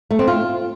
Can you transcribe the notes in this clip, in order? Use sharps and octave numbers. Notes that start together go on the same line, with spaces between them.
A3
C4
F4